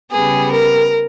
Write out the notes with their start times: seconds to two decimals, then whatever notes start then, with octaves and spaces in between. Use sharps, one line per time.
0.12 C#3 G3 B3 G#4
0.52 A#4